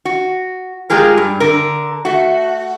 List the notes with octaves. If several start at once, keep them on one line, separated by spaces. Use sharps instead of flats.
F#4
G#3 F4 G4 G#4 A#4
G2
D3 A#4
A3 F#4